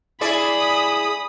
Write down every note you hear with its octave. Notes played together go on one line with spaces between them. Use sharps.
E4 G#4 D5 B5 D#6